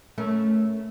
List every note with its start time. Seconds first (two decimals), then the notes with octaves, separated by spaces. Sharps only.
0.18 A3 C#4 A#4